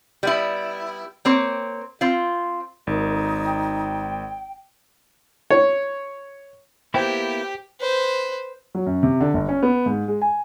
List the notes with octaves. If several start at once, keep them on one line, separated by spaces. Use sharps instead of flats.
G3 B3 E4
A#3 C4 C#5
C4 F4
G#1 D#4 A#4
G5
C#5
A#3 B3 E4 G4 C5 G5
B4 C5
F#3
F#2
C3
D3
G1
C#4
B3
G#2
G#3
G#5